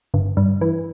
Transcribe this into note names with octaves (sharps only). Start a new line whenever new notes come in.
G1
G2
E3